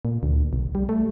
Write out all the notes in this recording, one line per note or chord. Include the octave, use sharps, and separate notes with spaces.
A#2
D2
B1
G3
A3